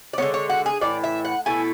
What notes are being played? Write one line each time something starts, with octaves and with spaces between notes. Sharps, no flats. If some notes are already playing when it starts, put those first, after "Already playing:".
D5
D3 G#3 B3 C#5
C#5
F#4
G#4
A2 E3 D5
E5
F#5
B2 A3 E4 G#5